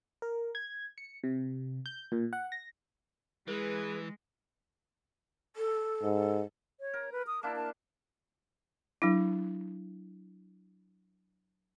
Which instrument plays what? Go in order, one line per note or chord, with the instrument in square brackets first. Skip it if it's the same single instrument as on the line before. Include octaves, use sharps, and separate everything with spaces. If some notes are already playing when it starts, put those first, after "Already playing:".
[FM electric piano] A#4
G#6
C#7
C3
G6
A#2
F#5
A#6
[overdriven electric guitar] E3 [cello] G#3 [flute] G#4 [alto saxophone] B4
[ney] A4
[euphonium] G#2
[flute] C#5
[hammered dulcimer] A#4
[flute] B4
D#6
[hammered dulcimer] A#3 D4 E4 [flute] A5
[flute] A5
[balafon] F#3 D4 E4